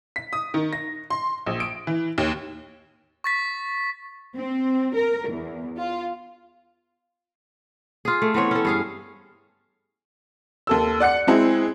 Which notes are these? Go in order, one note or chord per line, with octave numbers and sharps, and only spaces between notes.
B6
D#6
D#3
A#6
C6
A#1
D7
E3
D#2
C#6 A6 B6
C4
A#4
E2
F4
F4 G#4
A3
E3 B3 C4 C#5
C#4 A4
G2 G#4 F5
D#2 A4 E6
D5 F#5 F#6 C#7
G#3 C4 E4 G#4